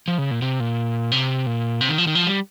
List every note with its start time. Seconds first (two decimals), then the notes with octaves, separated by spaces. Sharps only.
0.08 F3
0.18 C#3
0.31 A#2
0.42 C3
0.60 A#2
1.12 C3
1.46 A#2
1.81 C3
1.89 D#3
1.98 F3
2.07 D#3
2.15 F3
2.27 G3